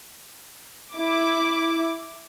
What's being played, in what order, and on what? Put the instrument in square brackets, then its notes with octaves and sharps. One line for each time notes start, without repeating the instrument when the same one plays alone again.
[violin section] E4 D6